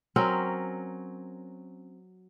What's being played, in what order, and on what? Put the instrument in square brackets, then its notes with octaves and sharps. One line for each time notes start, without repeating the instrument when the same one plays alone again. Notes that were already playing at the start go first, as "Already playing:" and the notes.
[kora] F#3 C4 C#4 A#4